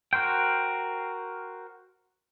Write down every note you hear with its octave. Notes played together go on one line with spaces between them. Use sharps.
F#4 A#4 C5 G5